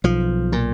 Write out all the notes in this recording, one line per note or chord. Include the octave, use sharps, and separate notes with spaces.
B1 F3
A#2